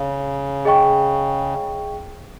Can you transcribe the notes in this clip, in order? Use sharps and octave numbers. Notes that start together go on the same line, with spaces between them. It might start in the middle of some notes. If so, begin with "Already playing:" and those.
Already playing: C#3
G#4 D#5 G5 C#6